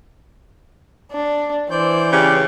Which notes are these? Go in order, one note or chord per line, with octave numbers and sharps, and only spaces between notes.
D4
E3 C5 D5 G6
C#3 G4